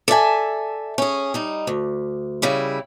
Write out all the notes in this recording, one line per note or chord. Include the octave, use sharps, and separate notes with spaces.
A4 D5 E5 G#5
C#4 G#4
G3 D#4
D2
C#3 G3 E4